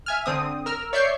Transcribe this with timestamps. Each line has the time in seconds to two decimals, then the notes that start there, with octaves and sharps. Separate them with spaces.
0.06 E5 G#5 F6
0.26 D3 C4 D#6
0.66 A#4 E6 F6
0.93 C#5 D5 E5 C#6 G6 C7